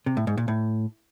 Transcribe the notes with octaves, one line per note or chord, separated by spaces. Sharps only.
C3
A2
G#2
A#2
A2